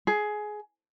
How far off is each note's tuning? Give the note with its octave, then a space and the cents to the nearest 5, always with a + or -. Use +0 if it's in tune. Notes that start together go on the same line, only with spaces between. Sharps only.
G#4 +15